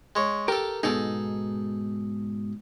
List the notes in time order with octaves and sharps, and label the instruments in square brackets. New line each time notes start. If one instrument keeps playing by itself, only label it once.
[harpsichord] G#3 C#5
[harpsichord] G4 A4 [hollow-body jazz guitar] A#4
[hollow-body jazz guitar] G#2 B2 D#4 [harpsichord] G#4 A4